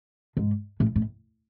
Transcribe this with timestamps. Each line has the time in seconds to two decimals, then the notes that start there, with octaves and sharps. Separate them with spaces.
0.37 G#2
0.80 A2
0.96 A2